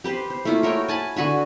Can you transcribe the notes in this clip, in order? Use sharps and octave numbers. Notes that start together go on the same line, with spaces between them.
G4 B4 C5
C5
A3 A#3 E4 F4
F#4 A#4 C#5 G5
G#5 A5 B5
D3 F#4 B4 G#5